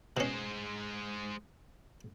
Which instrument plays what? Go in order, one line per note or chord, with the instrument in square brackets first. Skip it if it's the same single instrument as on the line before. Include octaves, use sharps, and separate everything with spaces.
[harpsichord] B2 C#4 [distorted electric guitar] G#3 C5